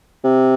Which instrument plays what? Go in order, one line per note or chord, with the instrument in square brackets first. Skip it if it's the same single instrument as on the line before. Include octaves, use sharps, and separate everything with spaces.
[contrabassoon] C3